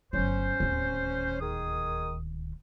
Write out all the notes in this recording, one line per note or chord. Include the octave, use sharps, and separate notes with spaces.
G1 F#3 C#4 C5
D1 D#2
D#3 G#4 D#6